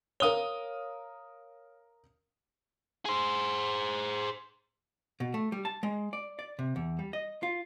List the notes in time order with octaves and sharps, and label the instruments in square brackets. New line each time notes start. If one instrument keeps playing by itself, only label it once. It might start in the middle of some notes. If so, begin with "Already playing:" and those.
[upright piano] A#4 D#6 G7 [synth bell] C#5 F5
[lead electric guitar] G#4 C5
[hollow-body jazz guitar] B2
A3
G3
A5
G#3
D5
D5
C3
E2
G3
D#5
F4